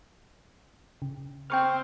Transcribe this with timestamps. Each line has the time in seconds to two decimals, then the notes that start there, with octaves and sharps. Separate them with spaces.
1.02 C#3
1.50 C4 G5 C#6 F6